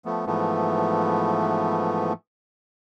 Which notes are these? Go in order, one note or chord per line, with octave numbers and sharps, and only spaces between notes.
F3 A3 B3
G#2 E3 F3 A3 B3